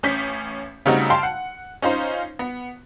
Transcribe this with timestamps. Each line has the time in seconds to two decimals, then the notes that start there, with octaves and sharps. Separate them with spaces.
0.03 A1 C#4 G6 B6
0.86 C#3 G3 A3 C4 D#4 F#4
1.10 F5 G5 A5 C6
1.23 F#5
1.82 C#4 D#4 F4 C5
2.39 B3